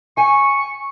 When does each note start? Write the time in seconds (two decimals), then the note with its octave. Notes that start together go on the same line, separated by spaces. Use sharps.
0.17 G5 G#5 C#6